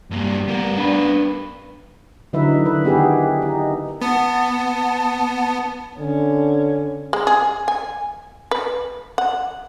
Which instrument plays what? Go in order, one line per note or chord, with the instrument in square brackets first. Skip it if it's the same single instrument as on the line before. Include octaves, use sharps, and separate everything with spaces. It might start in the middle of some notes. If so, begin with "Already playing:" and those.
[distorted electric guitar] G2 A#3 [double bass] G3
[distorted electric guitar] B3 A#4
[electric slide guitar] D4 B4
[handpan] D3 F#3 D#4 E4 B4 E5
D#3 B4
D#3 B3 G4 G#4 B4
D#4
[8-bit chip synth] B3 [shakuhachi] A5
[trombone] D3 [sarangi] C#4
[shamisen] G#3
G#4
G#5
B4
F#5